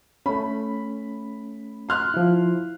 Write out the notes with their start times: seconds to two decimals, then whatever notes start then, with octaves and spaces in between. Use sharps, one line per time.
0.26 A3 C#4 B5
1.89 C6 F6 F#6
2.14 F3 E4